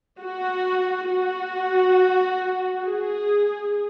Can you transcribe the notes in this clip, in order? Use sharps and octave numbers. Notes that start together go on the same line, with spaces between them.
F#4
F#4
G#4